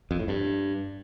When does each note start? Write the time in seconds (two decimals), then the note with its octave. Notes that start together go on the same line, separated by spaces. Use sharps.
0.11 F2
0.19 A2
0.28 G2